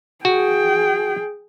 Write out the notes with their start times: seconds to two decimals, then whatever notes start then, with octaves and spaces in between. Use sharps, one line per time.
0.25 F#4 G#4 G5